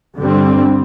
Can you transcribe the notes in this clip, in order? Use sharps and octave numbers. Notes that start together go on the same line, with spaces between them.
G2 D3 G3 C4